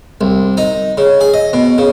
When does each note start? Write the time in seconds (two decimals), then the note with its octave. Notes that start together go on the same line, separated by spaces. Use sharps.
0.21 C2
0.57 D#4
0.98 C#3
1.21 G#4
1.34 D#5
1.53 B2
1.78 C#3